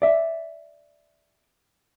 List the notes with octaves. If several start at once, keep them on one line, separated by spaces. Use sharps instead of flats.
D5 E5